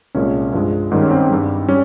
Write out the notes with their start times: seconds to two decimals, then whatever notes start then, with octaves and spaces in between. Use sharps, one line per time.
0.15 C2 A#2 G#3 C#4
0.53 G2 F3 G#3
0.91 G#2 D#3 G3 C#4
1.02 C#4
1.11 C4
1.30 G2 G3
1.68 G3 C#4